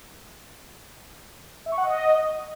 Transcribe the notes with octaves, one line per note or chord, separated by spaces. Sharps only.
E5
C#6
F#5
D#5